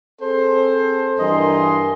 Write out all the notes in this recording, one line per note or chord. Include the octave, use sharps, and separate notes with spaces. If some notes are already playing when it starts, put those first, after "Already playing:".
C4 G#4 A4 C5
G2 E3 A#4 D#5 G#5 C6